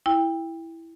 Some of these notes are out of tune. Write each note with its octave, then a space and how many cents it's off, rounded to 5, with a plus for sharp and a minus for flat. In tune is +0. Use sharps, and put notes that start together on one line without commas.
E4 +0 G5 +20